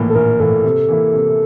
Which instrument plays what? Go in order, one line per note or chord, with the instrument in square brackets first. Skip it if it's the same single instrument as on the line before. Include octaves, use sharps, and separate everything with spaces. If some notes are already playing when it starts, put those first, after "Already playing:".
Already playing: [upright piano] A#1 A2 E3 A#3
[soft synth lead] A4
[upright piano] A#1 [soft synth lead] A#4
[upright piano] A2 E3 A#3 [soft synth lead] A4
[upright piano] C3
E3 A#3 E4
C3